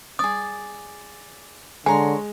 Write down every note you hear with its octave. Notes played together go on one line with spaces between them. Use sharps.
G#4 D5 D#6
D3 G#3 C#5 G#5 A#5 C6